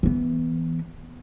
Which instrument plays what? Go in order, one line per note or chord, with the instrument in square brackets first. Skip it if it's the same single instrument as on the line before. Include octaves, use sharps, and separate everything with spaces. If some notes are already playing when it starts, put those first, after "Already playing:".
[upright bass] E3 B3